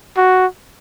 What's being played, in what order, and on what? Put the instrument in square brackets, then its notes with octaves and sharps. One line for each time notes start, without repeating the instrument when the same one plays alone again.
[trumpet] F#4